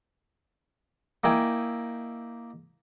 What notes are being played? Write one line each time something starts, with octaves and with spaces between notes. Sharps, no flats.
A#3 D#4 E4 G5 G#5